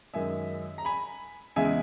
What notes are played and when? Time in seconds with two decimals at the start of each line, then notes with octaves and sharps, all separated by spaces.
0.14 F#2 D#3 G#3 E5 G#5
0.78 A#5
0.85 G#5 B5
1.56 E2 C#3 G#3 E5 G#5